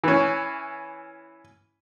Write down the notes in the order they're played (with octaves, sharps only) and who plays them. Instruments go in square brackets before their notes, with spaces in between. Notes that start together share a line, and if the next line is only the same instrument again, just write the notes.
[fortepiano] E3 C#4